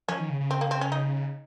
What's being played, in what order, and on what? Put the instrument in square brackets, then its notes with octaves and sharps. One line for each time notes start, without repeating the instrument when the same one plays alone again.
[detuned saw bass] F3 [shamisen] C#4
[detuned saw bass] D#3
C#3
C#3
[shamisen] C4
A#3
C4
C#4
D#4